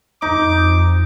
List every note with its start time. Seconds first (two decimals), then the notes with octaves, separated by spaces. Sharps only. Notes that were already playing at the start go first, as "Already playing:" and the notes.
0.22 F2 D#4 D6